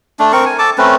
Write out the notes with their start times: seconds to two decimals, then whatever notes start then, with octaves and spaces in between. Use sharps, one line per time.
0.19 A3 D4
0.33 C4 A#4 C#6
0.46 G#5
0.59 A4 A5 D6
0.78 A3 C4 C#4 B4